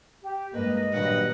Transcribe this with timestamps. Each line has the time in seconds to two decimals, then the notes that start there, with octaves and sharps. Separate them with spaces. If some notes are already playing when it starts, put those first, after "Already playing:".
0.22 G4
0.53 G2 G#3 A#3 B4 D#5
0.92 G2 A#2 D#3 F#3 B4 F#5